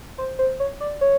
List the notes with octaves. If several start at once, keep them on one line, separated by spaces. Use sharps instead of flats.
C5
C5
C#5
D5
C#5